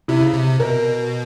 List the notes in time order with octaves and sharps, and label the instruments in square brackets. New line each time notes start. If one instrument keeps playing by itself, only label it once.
[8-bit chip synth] C3 [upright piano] E4
[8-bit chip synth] C#3
C3
[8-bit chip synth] B2 [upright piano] A#4